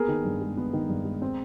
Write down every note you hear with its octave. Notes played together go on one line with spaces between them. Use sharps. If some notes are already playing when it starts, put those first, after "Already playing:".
Already playing: A#3 B3 G#4 A#4
D#3
G2
G#3
B3
D#3
G2
G#3
C4